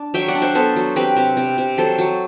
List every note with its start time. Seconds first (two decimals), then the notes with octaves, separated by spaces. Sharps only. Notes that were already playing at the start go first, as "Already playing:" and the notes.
Already playing: D4 A5
0.14 F#3 E5 G5
0.28 D5 F#5
0.35 D4
0.42 C5 E5
0.55 B3 A4 C5
0.76 F#3
0.96 C4 G4 B4
1.16 C3
1.37 C3
1.58 C3
1.78 F#3 A4 C5
1.98 F#3